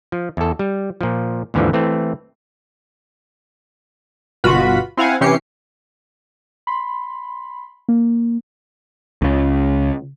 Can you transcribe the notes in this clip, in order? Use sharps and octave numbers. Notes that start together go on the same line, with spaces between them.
F3
E2 A4
G3
A#2 F3
D#2 G#2 D3 E3 F3
E3 A3 C4
G1 B2 F4 F#4 B5
C4 E4 F5 F#5 G#5
C3 E3 C#4 G4 C7 C#7
B5 C6
A#3
C#2 C#3